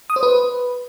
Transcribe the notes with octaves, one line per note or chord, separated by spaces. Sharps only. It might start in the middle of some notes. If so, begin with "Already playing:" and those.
D#6
C5
B4